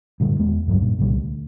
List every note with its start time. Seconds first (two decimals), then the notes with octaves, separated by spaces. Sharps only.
0.20 G2 A#2 D3 G3
0.39 E2 G#3 B3
0.67 C#2 G2 F3 F#3
0.82 G2 A#2
0.98 C2 A#2 D3 G3
1.15 D2